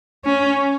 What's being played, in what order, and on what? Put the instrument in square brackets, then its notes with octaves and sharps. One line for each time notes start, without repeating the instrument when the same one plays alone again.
[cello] C#4